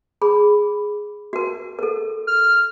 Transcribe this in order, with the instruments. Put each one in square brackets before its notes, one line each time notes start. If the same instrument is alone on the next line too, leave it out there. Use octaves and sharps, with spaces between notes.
[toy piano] G#4 B5
F#4 A#4
A4 A#4
[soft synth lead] F6